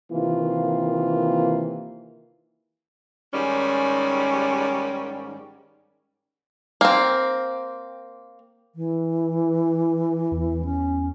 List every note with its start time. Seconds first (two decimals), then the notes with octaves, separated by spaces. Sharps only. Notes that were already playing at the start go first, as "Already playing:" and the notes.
0.12 C3 D#3 E3 A#3 F4
3.33 G#2 D#3 G3 C#4
6.81 A#3 C4
8.75 E3
10.32 E2
10.65 C#4